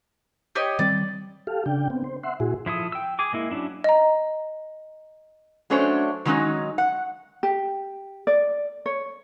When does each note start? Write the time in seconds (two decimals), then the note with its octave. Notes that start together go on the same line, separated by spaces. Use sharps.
0.55 G4 C#5 D#5
0.79 D#3 G3 C4 D5
1.47 G4 A4 F5
1.66 C#3 D4 G5
1.90 B3 C4
2.04 C5
2.23 E5 F#5 C6
2.40 A#2 E4 F#4 G#4
2.66 F3 E4 A4 D#6
2.92 G5 E6
3.19 G#4 G#5 D6
3.33 G#3 A#3 E4
3.51 F#3 C#4 D4 E4
3.84 D#5 A#5
5.70 F#3 A3 C#4 D4 C5 C#5
6.25 D#3 F#3 G#3 B3 C#4 D#4
6.78 F#5
7.43 G4
8.27 D5
8.86 C#5